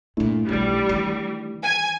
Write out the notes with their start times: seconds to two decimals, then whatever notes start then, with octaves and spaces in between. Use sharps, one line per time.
0.17 G2 A#2 A3 D4 E4
0.49 B1 E3 G3
0.89 D#3 E3
1.63 G#5